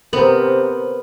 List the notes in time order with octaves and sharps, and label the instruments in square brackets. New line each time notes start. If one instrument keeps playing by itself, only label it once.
[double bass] C3 [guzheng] B3 [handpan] A#4 C5